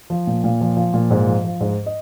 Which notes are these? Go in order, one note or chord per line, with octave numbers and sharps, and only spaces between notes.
F3
A#2
A#2
F3
F3
A#2
G#2
F3
F3
G#2
D#5